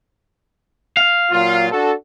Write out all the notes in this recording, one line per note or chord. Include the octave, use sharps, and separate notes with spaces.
F5
A#2 F#3 F4
D4 F#4 A4